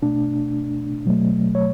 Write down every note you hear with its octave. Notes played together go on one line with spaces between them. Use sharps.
B2 A3 D4
B2 F#3 A3
C#5